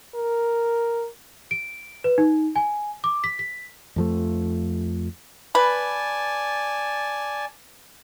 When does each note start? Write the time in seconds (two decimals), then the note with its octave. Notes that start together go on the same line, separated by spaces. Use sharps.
0.15 A#4
1.51 D7
2.04 B4
2.18 D#4
2.56 G#5
3.04 D6
3.24 B6
3.39 B6
3.96 F2 F3 A3
5.55 B4 D5 G#5 A5